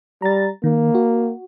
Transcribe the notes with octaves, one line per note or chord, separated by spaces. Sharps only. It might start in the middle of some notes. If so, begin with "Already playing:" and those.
G3 A#5 A6
D#3 A#3
F#4